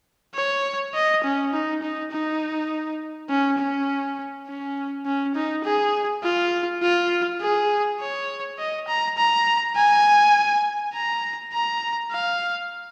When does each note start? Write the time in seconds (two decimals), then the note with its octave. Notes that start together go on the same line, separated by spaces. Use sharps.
0.35 C#5
0.94 D#5
1.24 C#4
1.53 D#4
1.82 D#4
2.12 D#4
3.29 C#4
3.59 C#4
4.47 C#4
5.06 C#4
5.35 D#4
5.64 G#4
6.23 F4
6.82 F4
7.41 G#4
8.00 C#5
8.59 D#5
8.88 A#5
9.17 A#5
9.76 G#5
10.94 A#5
11.53 A#5
12.12 F5